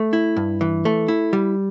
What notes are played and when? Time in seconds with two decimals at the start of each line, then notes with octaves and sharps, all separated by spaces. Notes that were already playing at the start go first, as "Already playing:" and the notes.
Already playing: A3
0.13 E4
0.37 G2
0.61 E3
0.85 A3
1.08 E4
1.33 G3